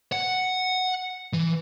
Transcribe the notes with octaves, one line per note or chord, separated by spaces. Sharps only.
F#5
E3